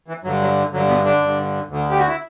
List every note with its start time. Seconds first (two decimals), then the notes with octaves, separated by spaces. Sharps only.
0.08 E3
0.24 G2 D3 F#3
0.41 F#3
0.72 G2 D3 F#3
0.88 B2 B3
1.05 D3 D4
1.21 G2 D3
1.69 D2 D3
1.90 G4
1.99 F#4
2.07 E4